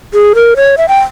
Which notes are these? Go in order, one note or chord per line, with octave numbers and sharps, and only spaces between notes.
G#4
A#4
C#5
E5
G5